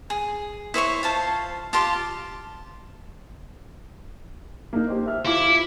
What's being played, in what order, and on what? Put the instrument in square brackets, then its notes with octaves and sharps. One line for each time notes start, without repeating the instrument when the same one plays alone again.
[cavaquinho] G#4
E4 C5 C#5 C#6
F4 C5 A5
F4 G4 A5 C6
[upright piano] A#3 D#4
G4 C5
E5 F6
[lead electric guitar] E4 [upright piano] F4 D6